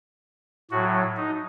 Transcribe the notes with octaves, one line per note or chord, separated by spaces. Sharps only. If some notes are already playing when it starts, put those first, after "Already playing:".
A2 F#3 F#4
D#4